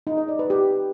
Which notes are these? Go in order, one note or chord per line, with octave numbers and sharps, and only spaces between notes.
D#4
D#5
D5
B4
G4